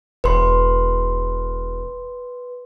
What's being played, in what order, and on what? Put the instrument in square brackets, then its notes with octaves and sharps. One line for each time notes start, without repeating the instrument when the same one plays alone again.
[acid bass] E1 [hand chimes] B4 C6